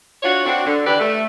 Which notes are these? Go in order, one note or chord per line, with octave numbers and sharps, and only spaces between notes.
D4 F4 F#4 C#5
C4 D4 F#4
D3
D3 E3 D4 G4 B4 D5
A3